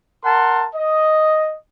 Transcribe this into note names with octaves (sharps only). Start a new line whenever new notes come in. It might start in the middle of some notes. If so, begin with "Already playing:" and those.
A#4 F#5 A5 C6
D#5